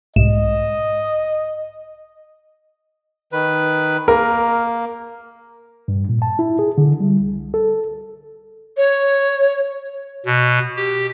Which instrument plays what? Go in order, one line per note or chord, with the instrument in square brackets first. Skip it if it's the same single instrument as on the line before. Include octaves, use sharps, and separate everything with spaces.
[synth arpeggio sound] B1 G#2 E7 [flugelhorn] D#5
[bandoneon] D#3 B4
[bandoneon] A#3 [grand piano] A#4
[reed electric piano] G2
A#2
A5
E4
G#4
D3
G3
C2
A4
[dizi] C#5
[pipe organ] B2
G4